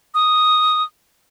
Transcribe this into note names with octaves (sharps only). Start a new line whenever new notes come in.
D#6